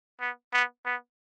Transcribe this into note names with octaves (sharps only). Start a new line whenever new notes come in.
B3
B3
B3